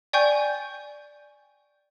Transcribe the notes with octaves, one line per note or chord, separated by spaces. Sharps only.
D5 G5 G#5 C#6 G6